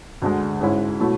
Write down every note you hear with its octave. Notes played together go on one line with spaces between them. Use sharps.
D2 D3 G#3
G#2 G#3 C#4 E4
B2 F#3 A3 E4